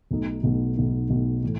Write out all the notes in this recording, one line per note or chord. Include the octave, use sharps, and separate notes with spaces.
B1 B2 A3 D#4
B1 B2 A3 D#4
B1 B2 A3 D#4
B1 B2 A3 D#4
A2 E3